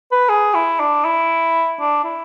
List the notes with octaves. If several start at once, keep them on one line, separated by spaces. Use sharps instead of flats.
B4
G#4
E4
D4
E4
D4
E4